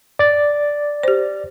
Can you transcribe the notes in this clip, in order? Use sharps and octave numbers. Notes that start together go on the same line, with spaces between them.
D5 A6
G4 C5